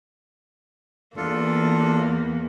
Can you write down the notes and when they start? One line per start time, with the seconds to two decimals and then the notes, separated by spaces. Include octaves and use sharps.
1.17 E2 A#3 D4 F4 A4